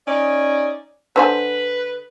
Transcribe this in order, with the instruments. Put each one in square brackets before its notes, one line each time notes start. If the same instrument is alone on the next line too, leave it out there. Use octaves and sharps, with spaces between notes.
[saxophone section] C#4 D#4 D5
[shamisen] D3 C5 G#5 [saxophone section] B4